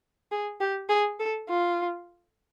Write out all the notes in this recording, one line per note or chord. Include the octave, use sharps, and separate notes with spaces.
G#4
G4
G#4
A4
F4